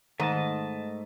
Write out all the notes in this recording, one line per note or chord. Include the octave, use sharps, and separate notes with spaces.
G#2 D#3 A3 D#5 A5